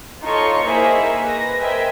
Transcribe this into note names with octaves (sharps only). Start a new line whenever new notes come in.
D#4 F4 A4 C#5 C6 C#6
A#3 D#4 E4 G#4 C5 E5
B4 A#6
A#4 C5 D#5 E5 G5 G#5